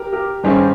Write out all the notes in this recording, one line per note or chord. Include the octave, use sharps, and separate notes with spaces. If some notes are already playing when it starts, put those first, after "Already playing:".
Already playing: G4 A#4
G4 A#4
G2 D#3 G3 C#4 G#4 C5